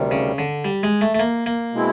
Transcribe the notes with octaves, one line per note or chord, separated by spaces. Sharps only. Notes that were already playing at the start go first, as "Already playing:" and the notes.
Already playing: D2 C3 D#3 G3
C#3
D3
G3
G#3
A3
A3
A#3
A#3
B2 G#3 C4 E4